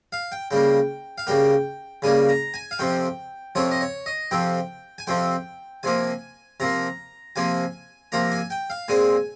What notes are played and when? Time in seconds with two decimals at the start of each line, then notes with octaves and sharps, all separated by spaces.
0.12 F5
0.32 G5
0.51 C#3 G3 A#3 G5
1.18 F5
1.27 C#3 G3 A#3 G5
2.02 C#3 G3 A#3 G#5
2.29 A#5
2.54 G#5
2.71 F5
2.79 F2 C3 F3 C4 G5
3.55 F2 C3 F3 C4 C#5
3.71 D#5
3.81 C#5
4.06 D#5
4.31 F2 C3 F3 C4 G5
4.98 G#5
5.07 F2 C3 F3 C4 G5
5.83 C3 F3 A#3 G#5
6.60 C3 F3 A#3 A#5
7.36 C3 F3 A#3 G#5
8.12 C3 F3 A#3 A#5
8.32 G#5
8.50 G5
8.70 F5
8.88 A#2 G#3 C4 G#5